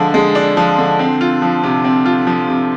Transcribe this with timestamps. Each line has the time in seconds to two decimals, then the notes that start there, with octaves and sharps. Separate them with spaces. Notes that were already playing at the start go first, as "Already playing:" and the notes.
Already playing: D3 F3 G#3 D4
0.14 G#3
0.35 D4
0.57 F3
0.78 D3
0.99 C4
1.21 F4
1.42 F3
1.63 C3
1.84 C4
2.06 F4
2.27 F3
2.48 C3